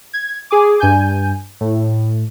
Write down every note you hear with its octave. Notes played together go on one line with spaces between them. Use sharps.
G#6
G#4 G#5 D6
G2 G#5 G6
A2